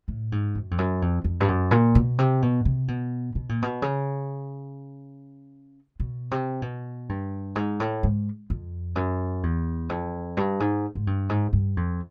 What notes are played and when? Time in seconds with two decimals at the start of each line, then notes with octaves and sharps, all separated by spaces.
0.08 A2
0.32 G#2
0.55 F#2
0.71 F2
0.78 F#2
1.02 F2
1.24 F2
1.40 G2
1.48 F#2
1.71 A#2
1.95 B2
2.18 C3
2.42 B2
2.65 C3
2.88 B2
3.35 B2
3.49 A#2
3.62 B2
3.82 C#3
6.00 B2
6.31 C3
6.62 B2
7.09 G2
7.55 G#2
7.80 A2
8.03 G#2
8.50 F2
8.96 F#2
9.43 E2
9.89 F2
10.37 G2
10.60 G#2
10.95 G#2
11.07 G2
11.29 G#2
11.53 G2
11.77 F2